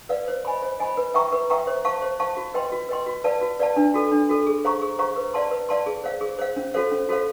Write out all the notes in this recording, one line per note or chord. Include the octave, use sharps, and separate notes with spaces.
B4 D5 F5
C5
D#5 G#5 B5
C5
D#5 G#5 B5
B4
E5 G5 A#5 C#6
B4
E5 G5 A#5 C#6
C5
F5 A5 C#6
C5
F5 A5 C#6
F#4
B4 D#5 G5 C6
F#4
B4 D#5 G5 C6
F#4
B4 D5 F5 A5
F#4
B4 D5 F5 A5
D4
F#4 A4
D4
F#4 A4
G#4
C5 F5 A#5 C#6
G#4
C5 F5 A#5 C#6
B4
D5 F5 A5 C6
B4
D5 F5 A5 C6
G#4
C5 F5
G#4
C5 F5
C#4
F#4 A4 C5 F5
C#4
F#4 A4 C5 F5